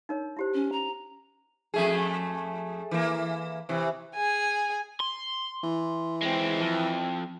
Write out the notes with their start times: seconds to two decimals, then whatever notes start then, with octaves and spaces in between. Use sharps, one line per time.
0.09 D#4 A#4 C#5
0.37 E4 G4 C5
0.54 C#4
0.72 A#5
1.74 F2 A3 G#4
2.91 E3 A#3
3.69 C3 E3
4.15 G#4 G#5
5.00 C6
5.63 E3
6.22 G#3 C4
6.61 F2